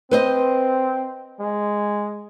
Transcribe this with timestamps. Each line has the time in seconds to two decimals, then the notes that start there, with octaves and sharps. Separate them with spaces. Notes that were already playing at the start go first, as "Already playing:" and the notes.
0.11 C4 B4 C5 D#5
1.40 G#3